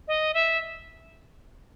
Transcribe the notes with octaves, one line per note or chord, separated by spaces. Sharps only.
D#5
E5